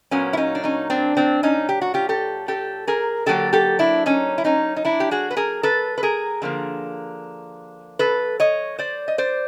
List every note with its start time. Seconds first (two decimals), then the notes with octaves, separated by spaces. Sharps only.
0.11 A#2 F#3 A#3 B3 C#4
0.33 E4
0.37 C#4 D#4
0.55 D4
0.64 C#4 D#4
0.90 C4 D4
1.17 C4 D4
1.43 C#4 D#4
1.69 G4
1.81 F#4
1.94 F4 G4
2.09 G4 A4
2.48 G4 A4
2.87 G#4 A#4
3.26 D3 F#3 A#3 G4 A4
3.53 G4 A4
3.79 D4 E4
4.06 C#4 D#4
4.38 E4
4.45 C#4 D#4
4.76 D#4
4.85 D4 E4
5.00 G4
5.11 F#4 G#4
5.31 B4
5.37 G#4 A#4
5.63 A4 B4
5.98 B4
6.03 G#4 A#4
6.42 D3 F3 A#3
7.99 A4 B4
8.40 C#5 D#5
8.79 C5 D5
9.08 D#5
9.18 C5 D5